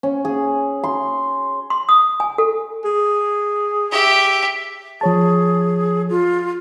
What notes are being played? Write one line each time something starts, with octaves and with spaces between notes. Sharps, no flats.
C#4
G#4
C6
C6
D#6
G#5
A4
G#4
G4 E5
F3 G#4 C#5 A5
F4